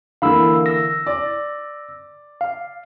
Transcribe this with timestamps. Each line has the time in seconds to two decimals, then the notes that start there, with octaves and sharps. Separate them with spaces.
0.22 D3 E3 A#3 F5 B5 E6
0.66 E6 A#6
1.06 D5
2.41 F5